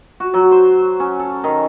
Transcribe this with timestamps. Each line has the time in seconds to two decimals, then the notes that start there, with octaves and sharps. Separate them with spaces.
0.20 F#4
0.34 F#3
0.51 C5
1.00 C#4
1.19 A4
1.44 D#3